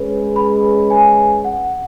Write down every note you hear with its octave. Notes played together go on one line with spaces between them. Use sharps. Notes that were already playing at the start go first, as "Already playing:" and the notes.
Already playing: G#3 C#4 G#4 B4
B5
G#5
F#5